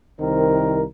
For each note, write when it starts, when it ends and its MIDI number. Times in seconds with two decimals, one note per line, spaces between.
0.20 0.84 36
0.20 0.84 51
0.20 0.84 60
0.20 0.84 70